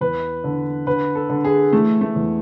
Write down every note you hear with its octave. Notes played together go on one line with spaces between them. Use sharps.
E2 B4
D3
D3 B4
A4
D3
G#4
E3 A3
A3
E2